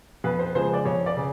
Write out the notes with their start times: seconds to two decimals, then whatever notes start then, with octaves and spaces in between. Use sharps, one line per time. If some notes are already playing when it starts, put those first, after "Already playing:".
0.24 F2 B4
0.39 C5
0.54 C#3 F3 G#3 C5
0.73 D5
0.85 F2 C#5
1.06 D5
1.17 C#3